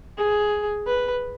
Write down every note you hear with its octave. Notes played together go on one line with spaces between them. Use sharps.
G#4
B4